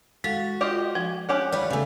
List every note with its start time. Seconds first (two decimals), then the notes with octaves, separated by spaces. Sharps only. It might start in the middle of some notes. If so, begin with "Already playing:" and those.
0.24 G#3 F#4 A4 F5
0.61 F4 G4 D#5
0.95 F3 G#5
1.29 C#4 G4 F#5
1.52 G3 B4 C#5 F5
1.70 C#3 A3 F5 G#5